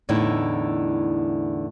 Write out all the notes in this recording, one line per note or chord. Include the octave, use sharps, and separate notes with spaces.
E2 A2 D3 D#4 E4